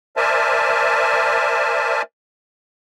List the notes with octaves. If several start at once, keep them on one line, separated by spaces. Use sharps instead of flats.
A#4 C5 D5 E5 G#5 A5